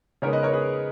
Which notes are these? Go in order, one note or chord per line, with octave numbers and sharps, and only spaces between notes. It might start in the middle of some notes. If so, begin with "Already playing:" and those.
C#3 G#3 B3 D#4 A#4 C#5
B4 D#5
A#4 C#5
G#4 B4